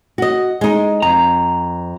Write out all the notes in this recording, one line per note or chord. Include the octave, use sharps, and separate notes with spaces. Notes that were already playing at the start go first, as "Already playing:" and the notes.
F#4 D#5
G#3 D#4
F2 A#5